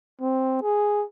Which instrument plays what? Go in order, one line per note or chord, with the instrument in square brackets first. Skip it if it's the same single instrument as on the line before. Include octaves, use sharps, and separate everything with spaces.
[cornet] C4
G#4